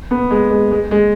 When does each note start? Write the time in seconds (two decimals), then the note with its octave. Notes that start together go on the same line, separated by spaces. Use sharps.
0.11 B3
0.31 G#3
0.50 G#3
0.71 G#3
0.91 G#3